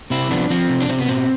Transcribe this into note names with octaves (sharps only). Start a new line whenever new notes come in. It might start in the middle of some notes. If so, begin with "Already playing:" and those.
C3 C4 E4
F3 B3 D4
F3 C4
C3
D4
C3 C4
B3
B2 C4